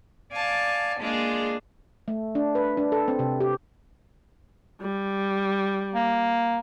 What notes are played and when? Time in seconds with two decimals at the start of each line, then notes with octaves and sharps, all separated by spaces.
0.33 D5 F5 G#5 A5
1.00 G#3 A#3 D4 F4 G#4
2.08 A3
2.35 D4
2.55 B4
2.77 D4
2.92 A4
3.08 C4
3.19 C3
3.40 G4
4.81 G3
5.95 A#3